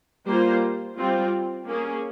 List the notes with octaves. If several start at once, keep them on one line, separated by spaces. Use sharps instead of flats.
G3 A#3 F4 C5
G3 C4 F4
A#3 C#4 G#4